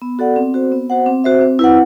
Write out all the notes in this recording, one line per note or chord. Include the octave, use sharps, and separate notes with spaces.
B3
F#4 A4 D5 F#5
C4
F#4 C5
B3
F#4 C5 F#5
C4
F#4 C5 E5
C4
E4 B4 F#5